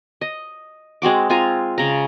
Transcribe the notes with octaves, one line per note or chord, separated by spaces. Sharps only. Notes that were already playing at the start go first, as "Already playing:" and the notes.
D#5
G#3 C4 F#4 D6
C4 F4 G#5 A#5
C#3 A#5